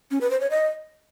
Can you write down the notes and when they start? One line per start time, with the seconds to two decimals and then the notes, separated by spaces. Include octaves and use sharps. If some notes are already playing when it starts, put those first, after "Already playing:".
0.11 C#4
0.21 B4
0.31 C5
0.41 C#5
0.50 D#5